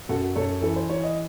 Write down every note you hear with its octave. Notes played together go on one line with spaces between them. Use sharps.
F#2 F#4 A4
F#2 A4 C#5
E3 A4
C5
E3 C#5
D#5